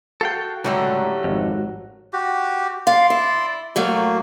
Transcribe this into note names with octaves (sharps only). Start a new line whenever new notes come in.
F#4 A4 F5 G5
C#2 A2 D3 F#3 G3 A3
G#1 F2
F#4 G4
D5 F5 C6
E4
A2 F#3 A3 A#3